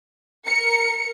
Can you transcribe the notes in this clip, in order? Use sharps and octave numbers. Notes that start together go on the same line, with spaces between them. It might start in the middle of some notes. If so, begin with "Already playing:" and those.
A#4 C#7